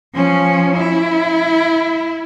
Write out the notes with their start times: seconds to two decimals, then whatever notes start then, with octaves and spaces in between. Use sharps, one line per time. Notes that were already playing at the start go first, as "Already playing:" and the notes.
0.14 F3 C#4
0.76 E4